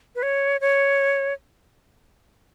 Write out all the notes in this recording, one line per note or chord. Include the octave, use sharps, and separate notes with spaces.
B4
C#5
C#5